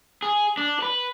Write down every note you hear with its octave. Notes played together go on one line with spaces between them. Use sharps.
G#4
D4
B4